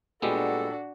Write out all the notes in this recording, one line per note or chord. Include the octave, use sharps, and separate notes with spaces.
A#2 G3 G#3 B3 D4 F#4 G4 A4